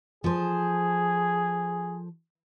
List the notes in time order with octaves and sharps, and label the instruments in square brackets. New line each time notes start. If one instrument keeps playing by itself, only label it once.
[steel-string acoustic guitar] F3 A4 C5 [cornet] G#4